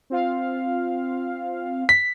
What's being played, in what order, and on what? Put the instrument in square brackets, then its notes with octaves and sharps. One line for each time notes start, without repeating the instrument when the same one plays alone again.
[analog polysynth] C4 F4 F5
[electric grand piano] B6